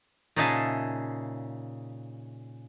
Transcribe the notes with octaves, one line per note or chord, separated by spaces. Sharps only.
A#2 C#3 D#4 G#4 E5 A5